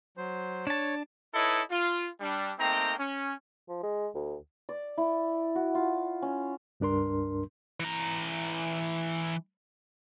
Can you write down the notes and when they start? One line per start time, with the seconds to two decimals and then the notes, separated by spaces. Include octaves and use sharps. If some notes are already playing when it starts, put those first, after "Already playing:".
0.17 F#3 C5
0.67 D4 C#5 A5
1.34 D#4 E4 A4 B4 C#5 D#5
1.71 F4
2.21 G3 D4
2.59 A3 A#3 C4 D#4 G5 A#5
2.99 C#4
3.69 F3
3.83 G#3
4.15 D2
4.69 D5
4.98 E4
5.55 F#4
5.75 F4
6.22 C#4
6.80 C#2 G2 D4 A#4 C6
7.80 E3 A#5